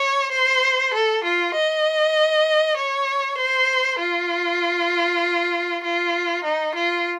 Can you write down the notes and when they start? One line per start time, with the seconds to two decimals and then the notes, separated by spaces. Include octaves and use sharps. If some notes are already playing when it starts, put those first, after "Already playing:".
Already playing: C#5
0.32 C5
0.94 A4
1.24 F4
1.54 D#5
2.77 C#5
3.38 C5
3.99 F4
5.84 F4
6.44 D#4
6.75 F4